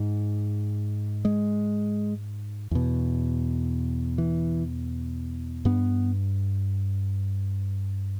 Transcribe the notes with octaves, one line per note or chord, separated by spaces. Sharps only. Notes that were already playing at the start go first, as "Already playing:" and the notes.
Already playing: G#2
G#3
E2 B2
E3
G2 B3